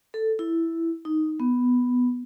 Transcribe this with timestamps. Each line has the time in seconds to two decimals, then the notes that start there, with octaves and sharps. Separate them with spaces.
0.14 A4
0.39 E4
1.05 D#4
1.40 B3